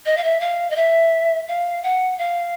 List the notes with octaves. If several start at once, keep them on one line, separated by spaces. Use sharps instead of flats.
D#5
F5
E5
F5
D#5
E5
F5
F#5
F5